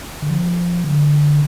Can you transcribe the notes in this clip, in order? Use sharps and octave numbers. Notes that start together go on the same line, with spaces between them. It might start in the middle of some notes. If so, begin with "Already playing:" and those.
D3
F3
D3